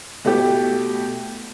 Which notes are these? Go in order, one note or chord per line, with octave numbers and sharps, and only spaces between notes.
B2 A3 E4 G4